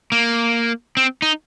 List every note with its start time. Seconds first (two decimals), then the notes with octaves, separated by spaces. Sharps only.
0.12 A#3
0.97 C4
1.22 D#4